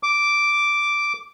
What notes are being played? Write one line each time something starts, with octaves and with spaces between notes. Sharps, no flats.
D6